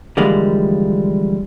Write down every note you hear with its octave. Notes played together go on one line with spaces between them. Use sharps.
D3 E3 F3 G3 G#3 A#3